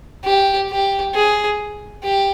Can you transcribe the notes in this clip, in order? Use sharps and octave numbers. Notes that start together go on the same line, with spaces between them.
G4
G4
G#4
G4